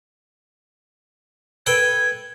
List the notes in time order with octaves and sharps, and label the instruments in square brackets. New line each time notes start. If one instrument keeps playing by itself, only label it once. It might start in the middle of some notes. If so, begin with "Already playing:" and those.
[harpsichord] A4 B4 G5 [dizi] G#6